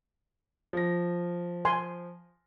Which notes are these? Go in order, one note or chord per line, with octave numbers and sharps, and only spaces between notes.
F3 A#6
G#5 C6